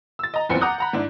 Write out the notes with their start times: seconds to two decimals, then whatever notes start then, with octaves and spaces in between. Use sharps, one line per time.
0.19 E6 A6
0.34 D#5 A#5
0.49 F#1 E2 A#2 C4 B4 C#7
0.61 F#5 A#5 D6 D#6 F#6 G6
0.78 F#5 A#5 B5
0.93 G#2 D4 E4